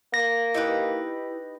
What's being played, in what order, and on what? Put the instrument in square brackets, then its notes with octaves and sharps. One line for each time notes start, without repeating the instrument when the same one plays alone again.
[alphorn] A#3 [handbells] A#6
[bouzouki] D#4 G4 B4 [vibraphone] E4